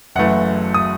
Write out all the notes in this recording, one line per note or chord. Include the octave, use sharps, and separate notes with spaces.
F#1 F#2 E3 A3 F#5
D#6